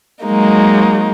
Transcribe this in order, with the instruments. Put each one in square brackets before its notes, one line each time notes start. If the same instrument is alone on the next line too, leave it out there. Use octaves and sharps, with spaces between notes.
[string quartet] F#3 G#3 A#3 D#4